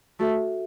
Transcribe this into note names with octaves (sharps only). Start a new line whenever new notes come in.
A3 F#4 A4 E5